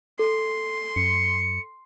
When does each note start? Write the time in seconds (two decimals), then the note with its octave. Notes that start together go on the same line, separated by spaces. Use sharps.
0.19 A4 C6
0.96 F#2 C#7